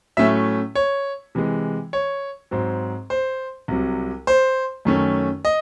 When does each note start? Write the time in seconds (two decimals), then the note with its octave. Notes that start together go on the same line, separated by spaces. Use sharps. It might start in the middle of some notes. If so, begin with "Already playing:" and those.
0.17 A2 F#3 A3 C#4 E5
0.75 C#5
1.35 C3 E3 G#3
1.93 C#5
2.51 G#2 F#3 C4
3.10 C5
3.68 C2 C3 F#3
4.27 C5
4.85 F#2 D#3 A3 C#4
5.45 D#5